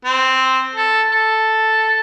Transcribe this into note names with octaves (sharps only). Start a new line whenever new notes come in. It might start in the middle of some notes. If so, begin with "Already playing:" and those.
C4
A4
A4